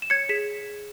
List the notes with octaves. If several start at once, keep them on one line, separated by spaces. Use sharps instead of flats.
E7
C#5 G#6 C#7
G#4 B6 E7